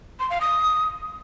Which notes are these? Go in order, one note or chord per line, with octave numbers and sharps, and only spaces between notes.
C6
F5
D#6